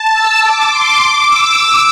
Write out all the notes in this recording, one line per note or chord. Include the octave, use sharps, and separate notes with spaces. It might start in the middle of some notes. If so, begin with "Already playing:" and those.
Already playing: A5
E6
D6
C6
D6
E6